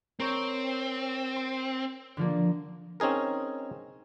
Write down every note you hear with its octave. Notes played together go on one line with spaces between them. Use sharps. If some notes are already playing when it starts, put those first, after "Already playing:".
C4 A#4 C#5
C6
D3 F3 A#3
C4 C#4 D#4 G#4 A#4